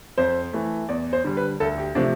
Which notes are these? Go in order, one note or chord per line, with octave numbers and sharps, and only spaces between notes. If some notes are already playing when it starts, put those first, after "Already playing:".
F2 C5
E3 A3
E2 D5
C5
D3 G3
B4
D2 A4
G4
C3 F3 A3 D4